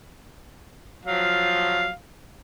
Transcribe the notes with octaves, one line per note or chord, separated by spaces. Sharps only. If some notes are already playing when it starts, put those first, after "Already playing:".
F3 F#3 F5